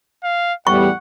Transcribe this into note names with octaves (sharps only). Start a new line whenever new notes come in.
F5
E2 A2 G3 F#5 C#6